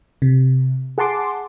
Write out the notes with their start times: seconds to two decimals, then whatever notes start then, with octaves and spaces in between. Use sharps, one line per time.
0.22 C3
0.98 G#4 F#5 A5 C6 D6